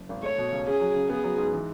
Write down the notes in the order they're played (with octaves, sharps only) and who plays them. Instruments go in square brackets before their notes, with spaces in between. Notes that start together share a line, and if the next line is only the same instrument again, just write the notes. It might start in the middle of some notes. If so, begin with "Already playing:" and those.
Already playing: [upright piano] F#1
G#1
[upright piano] A3 [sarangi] C#5
[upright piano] B2
C#2
[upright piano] C#4 [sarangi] G#4
[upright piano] F#3
C#3
[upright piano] B3 [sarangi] G#4
[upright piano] F#3
G#2
E3